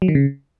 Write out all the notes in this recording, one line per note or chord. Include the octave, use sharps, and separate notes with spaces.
F#3
D#3
C#3